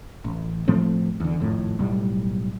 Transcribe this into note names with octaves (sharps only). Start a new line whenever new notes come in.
A1
A2 F3 A3 C4
E2 D3
G#1 F2 A2
B1 A2 G3